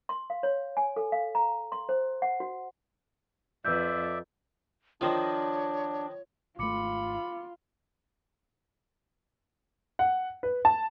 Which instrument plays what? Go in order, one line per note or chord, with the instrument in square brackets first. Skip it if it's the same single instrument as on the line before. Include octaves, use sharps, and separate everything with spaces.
[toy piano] C6
F5
C#5
G#5
A4
F5
A#5
C6
C5
F#5
F#4
[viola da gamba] F2 [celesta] B4 E6 G6 [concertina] D5 E5
[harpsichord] D#3 F3 [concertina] D4 [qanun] F4 C5 D#5 [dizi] C#5
[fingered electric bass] G#1 A3 [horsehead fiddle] F4 [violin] B5 [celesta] D6 C#7
[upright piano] F#5
B4
A5